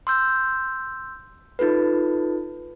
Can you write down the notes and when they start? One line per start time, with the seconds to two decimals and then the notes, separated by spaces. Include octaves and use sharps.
0.07 C6 E6 G6
1.59 D#4 F4 A4 B4